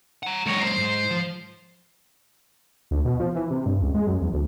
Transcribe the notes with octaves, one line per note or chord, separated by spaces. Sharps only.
F#5 A#5
F#3 G#3 A#4 C#5
C5
G#2
F3
D2
B2
F3
E3
C3
G2
C#2
G#3
F#2
E2
D2